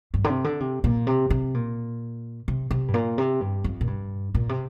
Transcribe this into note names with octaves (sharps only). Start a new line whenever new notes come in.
G2
D3
C3
D3
C3
A#2
C3
C3
A#2
C3
C3
G2
A#2
C3
G2
F2
A#2
G2
A#2
C3